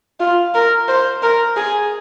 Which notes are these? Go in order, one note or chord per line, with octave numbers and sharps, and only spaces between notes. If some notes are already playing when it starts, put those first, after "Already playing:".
F4
A#4
C5
A#4
G#4